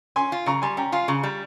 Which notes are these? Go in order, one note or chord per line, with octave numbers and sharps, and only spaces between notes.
C#4 G#5 C6
F4
C#3 A#5 C#6
G3 G#5 C6
C#4 G5 A#5
F4 F5 G#5
C#3 A#5 C#6
G3